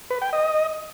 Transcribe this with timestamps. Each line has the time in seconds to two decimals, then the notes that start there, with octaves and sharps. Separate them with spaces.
0.11 B4
0.22 G5
0.33 D#5